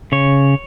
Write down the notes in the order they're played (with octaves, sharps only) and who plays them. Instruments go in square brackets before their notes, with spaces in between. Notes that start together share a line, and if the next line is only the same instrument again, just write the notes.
[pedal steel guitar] C#3 C#5